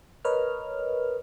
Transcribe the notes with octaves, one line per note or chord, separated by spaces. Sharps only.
A#4 B4 C#5 D#5 F6